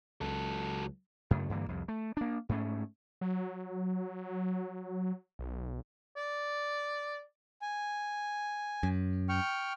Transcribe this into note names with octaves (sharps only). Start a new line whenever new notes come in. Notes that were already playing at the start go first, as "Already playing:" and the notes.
C#2 F#3 A4
F#2 C#3 A3
G2 D3 E3 A#3
C2 F2
A3
A#3 D4
G#2 A3 C#4
F#3
B1
D5
G#5
F#2
G5 C#6 F6